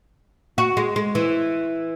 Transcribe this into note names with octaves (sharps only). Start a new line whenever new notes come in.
F#4
G#3
G#3
E3